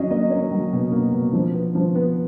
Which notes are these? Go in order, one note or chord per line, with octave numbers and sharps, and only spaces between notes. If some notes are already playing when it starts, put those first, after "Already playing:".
Already playing: F#3 C#4 D#5
A#3 D#5
A#3 C#5
F#3
B2
A#3
B2
F3
B3
F3
B3